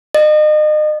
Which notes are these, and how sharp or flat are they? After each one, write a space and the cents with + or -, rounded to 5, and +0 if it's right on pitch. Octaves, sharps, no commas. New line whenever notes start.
D#5 -35